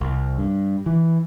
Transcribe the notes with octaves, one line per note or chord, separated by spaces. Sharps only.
C2
G2
E3